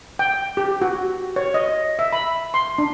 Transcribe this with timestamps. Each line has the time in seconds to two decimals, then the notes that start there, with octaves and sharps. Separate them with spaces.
0.19 G5
0.57 G4
0.82 F#4
1.36 C#5
1.54 D#5
1.99 E5
2.13 B5
2.54 C6
2.78 D4